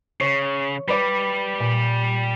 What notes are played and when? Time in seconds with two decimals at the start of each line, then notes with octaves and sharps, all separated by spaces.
0.21 C#3 C#5
0.88 G3 B4 D5 B5
1.60 A#2